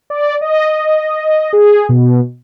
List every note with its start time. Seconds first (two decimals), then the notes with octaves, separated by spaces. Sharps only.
0.10 D5
0.41 D#5
1.53 G#4
1.89 B2